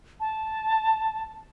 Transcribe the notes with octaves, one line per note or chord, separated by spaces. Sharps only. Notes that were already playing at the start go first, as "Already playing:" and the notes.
A5